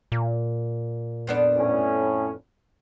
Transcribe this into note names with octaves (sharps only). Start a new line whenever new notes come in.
A#2
F2 B3 D4
A2 C#4